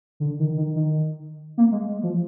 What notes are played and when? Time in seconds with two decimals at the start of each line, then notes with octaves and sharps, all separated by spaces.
0.20 D3
0.39 D#3
0.57 D#3
0.76 D#3
1.58 A#3
1.72 G#3
1.85 G#3
2.03 F3